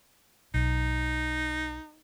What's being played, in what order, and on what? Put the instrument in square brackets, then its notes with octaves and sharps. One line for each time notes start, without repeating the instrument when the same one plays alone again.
[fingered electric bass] B1 [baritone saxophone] D#4